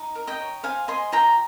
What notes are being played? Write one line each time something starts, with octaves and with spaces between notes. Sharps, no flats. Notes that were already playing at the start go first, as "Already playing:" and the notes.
Already playing: D#4
A#4
D#5 G5
C#5
C5 F5 G#5
D#5 G#5 C6
F4 G5 A#5